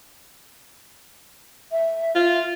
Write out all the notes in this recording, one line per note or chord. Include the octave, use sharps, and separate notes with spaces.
E5
F4